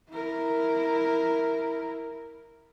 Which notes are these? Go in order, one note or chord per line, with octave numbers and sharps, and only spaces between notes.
E4 A#4